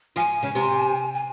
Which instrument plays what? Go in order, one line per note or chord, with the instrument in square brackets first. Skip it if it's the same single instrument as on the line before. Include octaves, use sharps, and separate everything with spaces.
[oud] F3 F4 [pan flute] G#5
[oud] C#3 C#4
C3 C4
[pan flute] G#5